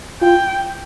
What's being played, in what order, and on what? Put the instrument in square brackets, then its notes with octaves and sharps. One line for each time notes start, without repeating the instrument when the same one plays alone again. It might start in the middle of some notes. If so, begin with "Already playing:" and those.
[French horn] F4 [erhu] G5